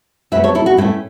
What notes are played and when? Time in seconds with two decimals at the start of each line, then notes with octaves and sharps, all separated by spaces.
0.32 F#2 F#3 A3 B4 E5
0.44 A4 C#5
0.55 E4 A4
0.66 F#4
0.77 A2 A3 C#4 E4